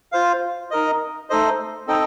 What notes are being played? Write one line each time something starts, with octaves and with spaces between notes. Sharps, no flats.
F4 C5 F5
D#4 A#4 D#5
A3 D#4 A4 C5 D#5
C4 D#4 A4 D#5 G5